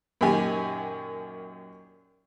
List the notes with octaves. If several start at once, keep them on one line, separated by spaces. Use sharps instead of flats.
F#2 A#2 D#3 G4 G#5